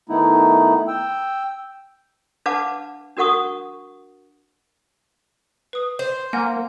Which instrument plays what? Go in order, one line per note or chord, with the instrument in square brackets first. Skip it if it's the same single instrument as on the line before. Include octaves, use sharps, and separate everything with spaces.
[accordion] D#3 A3 B3 D#4 E4
G5 E6
[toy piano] D4 B4 F5 F#5 A5 D6
D4 F#4 A#4 F#5 C#6 D#6
[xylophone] B4 D#6
[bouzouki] C5
[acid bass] A#3 [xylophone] F#5 G#5